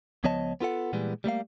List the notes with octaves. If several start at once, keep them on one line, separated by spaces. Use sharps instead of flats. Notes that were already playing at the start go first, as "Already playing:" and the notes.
C#2 F3 B3 C#5 D#5 A5
B3 F4 A4 F#5
A#2 E3 G3 G#3 B3
G3 A3 A#3 F5